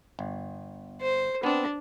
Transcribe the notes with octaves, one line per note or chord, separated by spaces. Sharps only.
G1
C5
B3 C4 D4